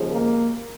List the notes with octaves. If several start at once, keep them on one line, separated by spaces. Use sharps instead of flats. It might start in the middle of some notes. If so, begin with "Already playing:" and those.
Already playing: D#2 C#3 F3 G#3
A#3